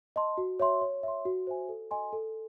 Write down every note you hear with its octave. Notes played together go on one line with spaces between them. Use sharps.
D#5 A5 C6
F#4
C#5 E5 C6
C#5
E5 C6
F#4
C5 E5 G#5
A4
D#5 G#5 C6
A4